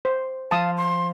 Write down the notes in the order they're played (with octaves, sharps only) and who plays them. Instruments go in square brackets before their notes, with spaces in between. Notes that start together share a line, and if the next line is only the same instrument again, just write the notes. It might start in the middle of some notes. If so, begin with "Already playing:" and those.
[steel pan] C5
[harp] F3 [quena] F5 [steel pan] A5 D#6
[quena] C6